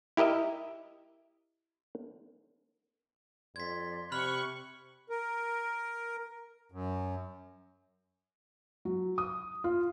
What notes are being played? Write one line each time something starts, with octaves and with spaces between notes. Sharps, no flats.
E4 G4 A#4 D#5 E5
F2 D5 C6 G#6 B6
C3 B5 C#6 F6 F#6 F#7
A#4
F#2
F#3
D#6
F4